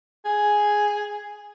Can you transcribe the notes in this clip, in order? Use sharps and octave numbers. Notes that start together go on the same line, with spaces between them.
G#4